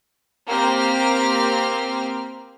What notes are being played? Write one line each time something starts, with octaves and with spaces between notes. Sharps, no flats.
A#3 C4 G4 F6